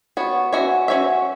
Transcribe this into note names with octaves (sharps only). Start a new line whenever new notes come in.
B3 F#4 C#5
C#4 F#4 C#5 E5
C#4 F#4 C#5 E5